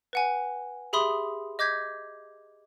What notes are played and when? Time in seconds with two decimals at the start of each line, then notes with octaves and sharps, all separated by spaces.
0.13 B4 F#5 G#5
0.93 G4 G#4 E5 B5 C6 D#6
1.59 D#5 D6 G6 G#6 B6